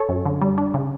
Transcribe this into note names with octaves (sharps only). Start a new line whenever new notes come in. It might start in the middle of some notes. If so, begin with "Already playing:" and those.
Already playing: A4 C#5
F#2
D3
G3
D4
C#3